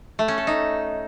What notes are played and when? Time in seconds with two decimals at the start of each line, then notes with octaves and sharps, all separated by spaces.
0.19 A3
0.28 C#4
0.38 A4
0.47 D#4